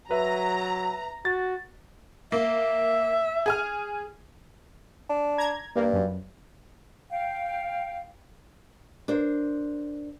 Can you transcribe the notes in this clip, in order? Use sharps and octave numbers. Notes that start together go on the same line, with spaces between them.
F#3 B4 E5 A#5
F#4 A6
A#3 E5
G#4 G#5 F6
D4
A#5 G#6
G2 A#3
F#2
F5 G5
D4 A#4 C5